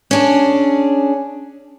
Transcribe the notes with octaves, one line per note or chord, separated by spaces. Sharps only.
C#4 D4 G#4